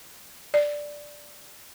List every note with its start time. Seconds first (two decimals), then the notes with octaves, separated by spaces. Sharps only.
0.54 D5